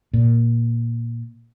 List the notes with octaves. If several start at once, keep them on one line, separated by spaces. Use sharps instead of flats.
A#2